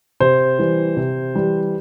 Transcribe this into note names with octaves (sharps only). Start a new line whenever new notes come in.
C3 C5
E3 G3
C3
E3 G3